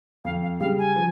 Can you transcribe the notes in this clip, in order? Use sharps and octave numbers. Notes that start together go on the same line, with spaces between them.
F2 F5
F5
C#3 G3 F5
G#5
F3